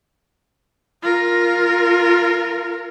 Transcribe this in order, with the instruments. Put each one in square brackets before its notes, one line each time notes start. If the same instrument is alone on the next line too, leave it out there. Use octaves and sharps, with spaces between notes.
[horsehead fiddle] F4 A#4